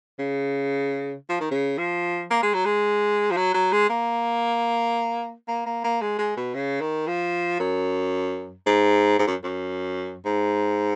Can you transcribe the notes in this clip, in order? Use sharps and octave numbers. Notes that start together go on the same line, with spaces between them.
C#3
F3
D#3
C#3
F3
A#3
G#3
F#3
G#3
F3
F#3
F#3
G#3
A#3
A#3
A#3
A#3
G#3
G#3
B2
C#3
D#3
F3
F#2
G#2
G#2
F#2
F#2
G#2